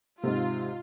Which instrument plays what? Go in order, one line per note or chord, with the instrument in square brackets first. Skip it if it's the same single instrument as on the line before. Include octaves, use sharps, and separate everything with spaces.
[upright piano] G#2 C3 [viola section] F4